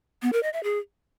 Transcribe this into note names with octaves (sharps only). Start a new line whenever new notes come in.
B3
A#4
D#5
E5
G#4